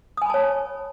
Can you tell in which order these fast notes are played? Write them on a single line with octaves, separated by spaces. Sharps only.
D#6 G#5 B5 A5 C#5